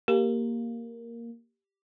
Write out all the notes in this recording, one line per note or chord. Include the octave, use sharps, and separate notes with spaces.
A#3 G4